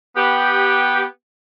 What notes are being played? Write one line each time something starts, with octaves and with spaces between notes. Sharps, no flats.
B3 G4